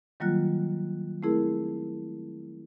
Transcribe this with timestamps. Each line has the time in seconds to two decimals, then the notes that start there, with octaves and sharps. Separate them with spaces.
0.20 D#3 F#3 G3 A#3 F4 F#6
1.23 A3 C4 E4 G#4 A#4